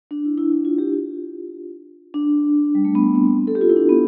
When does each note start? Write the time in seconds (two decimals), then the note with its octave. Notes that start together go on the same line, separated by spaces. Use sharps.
0.11 D4
0.25 E4
0.38 E4
0.52 E4
0.65 F4
0.78 G4
0.92 F4
2.14 D4
2.75 G3
2.85 A3
2.95 B3
3.15 C4
3.47 A4
3.55 G4
3.61 F4
3.69 E4
3.76 D4
3.89 B3